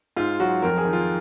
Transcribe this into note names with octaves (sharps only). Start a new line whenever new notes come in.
G#2 F4
F#3 F#4
F2 A#4
G#4
D#3
F4